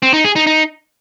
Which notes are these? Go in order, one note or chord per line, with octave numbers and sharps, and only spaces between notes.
C4
D#4
G#4
D#4
D#4